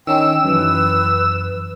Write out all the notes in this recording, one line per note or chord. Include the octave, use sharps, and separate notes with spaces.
D#3 C#4 D#4 G5 E6
F#2 E3 B4